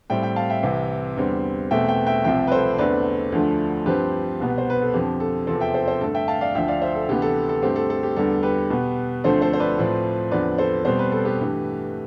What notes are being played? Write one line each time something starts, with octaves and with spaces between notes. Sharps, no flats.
A2 G3 C4 E5 G5
E5 G5
F5 A5
E5 G5
C2 C3 E3
E2 D3 G3 C4
E2 B2 A3 C4 E5 G5
E5 G5
E5 G5
C2 C3 F3 E5 G5
B4
A4 C5
E2 D3 A3 C4 B4 D5
D2 D3 F3 A3
G2 F3 C4 G4 B4
C2 B2 B3
C5
B4
A4
F2 D3 F3 G4
A4
E2 C3 F3 C4 A4
E5 G5
A4 C5
A4 C5
G2 D3 A3 A4
E5 G5
F5 A5
D5 F5
D2 D3 F3 E5 G5
D5 F5
C5 E5
A4
D2 C3 E3 B3 G4
A4
A4
G2 D3 A3 C4 G4
A4
A4
G4
E2 D3 G3 A4
G4 B4
B2 B3
D2 D3 F3 A3 C4 A4 C5
A4 C5
C5
B4 D5
A2 F3 C4
E2 D3 F3 C4 B4 D5
A4 C5
B2 G3 C4 C5
B4
A4
G4 B4
G2 E3 A3